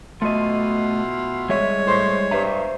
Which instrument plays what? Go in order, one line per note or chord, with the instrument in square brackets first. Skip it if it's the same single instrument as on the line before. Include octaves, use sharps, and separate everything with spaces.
[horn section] B2 E4 F4 [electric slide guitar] A3 D#5
[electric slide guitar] G3 G#3 E5 [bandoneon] C#5
[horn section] A2 C5
[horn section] G2 [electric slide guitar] C5 E5 A#5